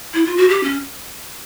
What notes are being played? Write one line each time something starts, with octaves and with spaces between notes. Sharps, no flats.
E4
F4
F#4
G4
C#4